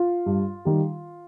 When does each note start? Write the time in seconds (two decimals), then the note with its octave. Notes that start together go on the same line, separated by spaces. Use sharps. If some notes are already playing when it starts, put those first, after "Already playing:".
Already playing: F4
0.26 G2
0.65 D#3 G3